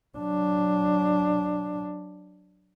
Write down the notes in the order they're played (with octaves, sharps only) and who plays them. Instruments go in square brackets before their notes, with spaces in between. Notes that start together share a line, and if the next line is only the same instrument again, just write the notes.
[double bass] F#3 D4